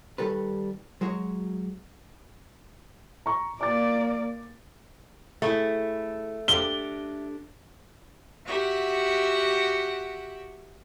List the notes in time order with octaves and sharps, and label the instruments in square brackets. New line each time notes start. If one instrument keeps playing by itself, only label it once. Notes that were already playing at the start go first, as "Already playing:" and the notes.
[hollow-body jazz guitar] D#3 G3 A4 B4
F#3 G#3 F#4 C#5
[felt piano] A#5 C#6
[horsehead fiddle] A#3 D5 [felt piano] D6 A6
[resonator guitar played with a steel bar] A3 [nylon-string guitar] E4 G#4 C5
[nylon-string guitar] D4 G4 A4 [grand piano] G7
[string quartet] F#4 G4 E5 F#5